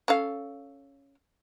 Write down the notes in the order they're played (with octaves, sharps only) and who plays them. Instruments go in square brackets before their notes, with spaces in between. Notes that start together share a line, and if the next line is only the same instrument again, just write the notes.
[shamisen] C#4 A4 F5